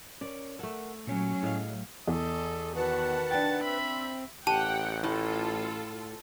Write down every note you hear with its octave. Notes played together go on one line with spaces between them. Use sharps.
C#4 A#4 C#5 D5
A3 A4 A#4 F#5
A#2 F#3 C#4 C#5
A2 G#4 D#5 F5
E2 A4 D#5
D#3 F#4 B4 F#5 A5
D4 G5 A6
C4 E5 B5
A1 G4 F#5 G5 A5 D#7
A2 F4 A4